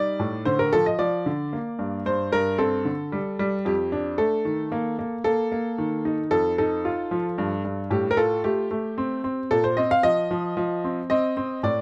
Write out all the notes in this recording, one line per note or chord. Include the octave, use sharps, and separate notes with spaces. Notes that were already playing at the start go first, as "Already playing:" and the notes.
Already playing: G3 D#4 D5
A2
D3 C5
A#4
F3 A4
D#5
F3 D5
D3
A#3
G2
G2 C5
G2 A#4
C4 A4
D3
G3
G3
F2 G4
D4
A3 A4
D#3
A#3
A#3
A#3 A4
A#3
D#3
D#4
F2 A4
D#4 A4
F4
F3
G2
G2
A2 G4
A#4
F4 A4
A3 G4
A3
C4
C4
A#2 A4
C5
C4 D#5
F5
F3 D#5
F3
F3
C4
C4 D#5
C4
A2 D5